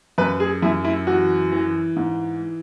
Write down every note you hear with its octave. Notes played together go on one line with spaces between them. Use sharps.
F#2 B4
G#4
F#2 E4
E4
E3 F#4
E3
G#2